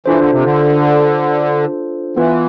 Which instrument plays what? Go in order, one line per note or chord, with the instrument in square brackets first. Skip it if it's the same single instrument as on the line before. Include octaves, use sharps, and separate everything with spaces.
[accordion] E3 [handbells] D4 F4 A4 C5
[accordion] D3
C3
D3
[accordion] E3 [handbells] B3 F4 B4